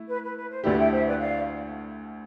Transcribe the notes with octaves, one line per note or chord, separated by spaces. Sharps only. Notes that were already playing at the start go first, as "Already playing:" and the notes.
Already playing: A3 E4
B4
B4
B4
C5
D2 D3 A3 E4 G4 B4 D5
E5 G5
C5 E5
B4 D5
D5 F5